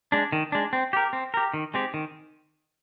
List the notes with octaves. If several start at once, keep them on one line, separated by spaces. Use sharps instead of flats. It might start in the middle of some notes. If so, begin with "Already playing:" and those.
G#3 D4
D#3
G#3 D4
C4
G4 A#4
C4
G4 A#4
D#3
G#3 C4 G4
D#3